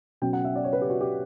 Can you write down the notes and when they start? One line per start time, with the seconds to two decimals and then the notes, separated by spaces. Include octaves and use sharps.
0.22 B2 F#3 C#4 G5
0.33 F#5
0.44 E5
0.55 D5
0.64 C#5
0.73 B4
0.81 G4
0.90 F#4
1.01 G4